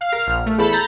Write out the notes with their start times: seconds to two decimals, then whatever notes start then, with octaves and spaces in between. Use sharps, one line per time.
0.01 F5 F6
0.13 A#4
0.27 A#1
0.46 A3
0.59 E2 A4 B5
0.72 A#5 G6 A6